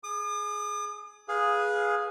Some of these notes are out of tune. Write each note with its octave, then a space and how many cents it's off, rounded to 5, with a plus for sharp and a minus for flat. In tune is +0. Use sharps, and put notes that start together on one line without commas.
G#4 +15 D#6 -45
G#4 +0 B4 -20 F5 +10